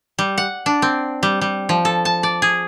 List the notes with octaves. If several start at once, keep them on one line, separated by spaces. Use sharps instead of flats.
G3
F#5
D4
C4
G3
G3
F3
A4
A5
D5
G#4